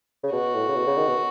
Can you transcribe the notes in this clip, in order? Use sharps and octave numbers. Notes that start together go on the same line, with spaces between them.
C#3
B2 F#4
A2
C#3
B2
C#3
D#3
B2